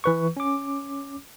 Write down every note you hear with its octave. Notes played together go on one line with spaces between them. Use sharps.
E3 B4 C#6
C#4 D6